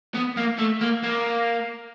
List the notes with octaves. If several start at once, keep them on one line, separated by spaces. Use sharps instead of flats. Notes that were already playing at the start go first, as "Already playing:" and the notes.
B3
A#3
A3
A#3
A#3